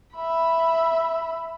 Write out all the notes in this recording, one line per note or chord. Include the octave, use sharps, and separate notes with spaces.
E5 B5